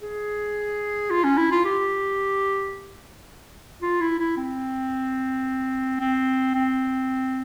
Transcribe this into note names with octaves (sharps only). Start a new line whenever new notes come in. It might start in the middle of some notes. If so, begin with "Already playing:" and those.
G#4
F4
C#4
E4
F4
G4
F4
E4
E4
C4
C4
C4